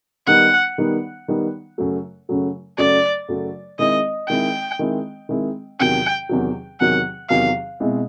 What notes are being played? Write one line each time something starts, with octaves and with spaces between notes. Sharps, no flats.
D#3 G3 B3 D#4 F#5
D#3 G3 B3 D#4
D#3 G3 B3 D#4
F#2 C#3 F#3 A3
F#2 C#3 F#3 A3
F#2 C#3 F#3 A3 D5
F#2 C#3 F#3 A3
D#3 G#3 C4 E4 D#5
D#3 G#3 C4 E4 G5
D#3 G#3 C4 E4
D#3 G#3 C4 E4
E2 C3 D#3 F#3 G5
E2 C3 D#3 F#3
E2 C3 D#3 F#3 F#5
E2 C3 D#3 F#3 F5
B2 G#3 C4 E4